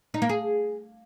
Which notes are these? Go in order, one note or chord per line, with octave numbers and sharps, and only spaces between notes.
D#4
A#3
G#4